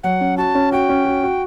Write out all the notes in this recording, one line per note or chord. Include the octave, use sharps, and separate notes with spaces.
F#3 F#5
C#4
F#4 A5
C#4
F#4 G5
C#4
F#4
F#4